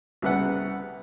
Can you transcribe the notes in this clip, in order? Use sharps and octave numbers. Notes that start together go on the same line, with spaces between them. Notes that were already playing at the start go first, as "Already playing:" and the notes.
C2 C#3 B3 B4 F#5